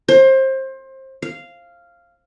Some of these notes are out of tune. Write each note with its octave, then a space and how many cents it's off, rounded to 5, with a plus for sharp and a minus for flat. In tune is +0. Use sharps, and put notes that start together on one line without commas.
C5 +25
F5 -10